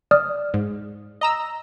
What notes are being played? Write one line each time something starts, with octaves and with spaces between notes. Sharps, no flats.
D5 D#6 F6
G#2
D#5 A#5 E6